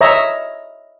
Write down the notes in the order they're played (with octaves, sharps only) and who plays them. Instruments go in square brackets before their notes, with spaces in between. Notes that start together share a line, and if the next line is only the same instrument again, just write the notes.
[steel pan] C#5 D#5 E5 A#5